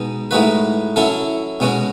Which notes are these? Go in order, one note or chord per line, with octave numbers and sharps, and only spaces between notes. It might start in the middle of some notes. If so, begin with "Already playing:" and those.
Already playing: B2 G#3 D#4
A2 G#3 D#4 F#4 B4
F#3 C#4 E4 A4
B2 G#3 C#4 F#4